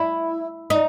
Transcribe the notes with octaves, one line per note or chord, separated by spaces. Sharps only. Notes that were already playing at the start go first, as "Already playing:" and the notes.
Already playing: E4
D#4